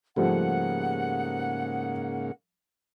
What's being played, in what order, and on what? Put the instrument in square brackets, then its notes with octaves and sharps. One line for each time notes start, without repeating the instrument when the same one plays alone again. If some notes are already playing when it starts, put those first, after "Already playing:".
[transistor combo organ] G#2 C#3 A#3 [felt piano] F3 G3 A3 [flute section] F#5